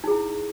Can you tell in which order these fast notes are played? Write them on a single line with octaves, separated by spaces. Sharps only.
D#4 G#4 E4